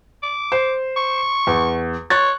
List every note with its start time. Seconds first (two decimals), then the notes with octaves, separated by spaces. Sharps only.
0.23 D6
0.52 C5
0.96 C#6
1.47 E2
2.10 C#5 C#6 F#6 A6